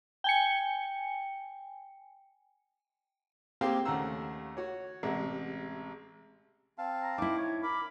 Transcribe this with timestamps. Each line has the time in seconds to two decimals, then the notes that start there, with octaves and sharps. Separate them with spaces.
0.24 G5 G#5 C#7
3.61 A#3 C4 G4 G#4 F5 G5
3.85 D#2 C#3 A3 F#5 A#5 E6
4.57 F#4 C#5
5.03 A1 C3 G#3 E5 F#5
6.78 C4 F5 A5
7.02 A#5
7.18 D#4 E4 D6
7.38 C#5
7.63 A#4 B5 D6